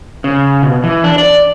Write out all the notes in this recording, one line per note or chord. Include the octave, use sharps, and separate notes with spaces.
C#3
B2
E3
D4
D5